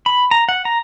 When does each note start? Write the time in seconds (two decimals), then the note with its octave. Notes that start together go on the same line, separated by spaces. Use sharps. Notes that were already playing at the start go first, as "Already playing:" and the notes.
0.06 B5
0.31 A#5
0.49 F#5
0.65 A#5